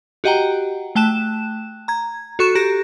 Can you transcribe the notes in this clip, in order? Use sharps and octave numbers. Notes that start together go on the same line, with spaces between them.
F#4 G4 D#5 F#5 G5 A#5
A3 G5 A5 F#6 E7
A#5 G#6
F#4 A4 C#6 F#6 E7
G4 A#5 F#6 A#6